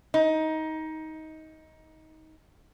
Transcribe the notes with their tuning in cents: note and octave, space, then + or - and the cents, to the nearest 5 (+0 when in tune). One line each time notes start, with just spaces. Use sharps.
D#4 +20